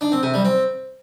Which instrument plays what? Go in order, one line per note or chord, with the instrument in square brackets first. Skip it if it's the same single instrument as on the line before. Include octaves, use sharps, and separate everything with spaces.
[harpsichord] D4
C4
C3
G3
C4